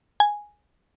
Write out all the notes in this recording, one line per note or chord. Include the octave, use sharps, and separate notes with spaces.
G#5